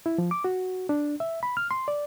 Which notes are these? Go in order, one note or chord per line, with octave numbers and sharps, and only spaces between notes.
E4
F3
D6
F#4
D4
E5
B5
F6
C6
D5